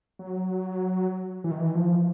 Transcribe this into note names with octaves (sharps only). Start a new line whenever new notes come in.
F#3
E3
D#3
E3
F3